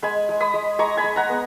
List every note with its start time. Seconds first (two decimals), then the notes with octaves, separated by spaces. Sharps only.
0.03 G#3 G#5 B5
0.29 G#3
0.40 B5 D#6
0.54 G#3
0.79 G#3 A#5 C#6
0.97 G#5 B5
1.04 G#3
1.16 F#5 A#5
1.29 B3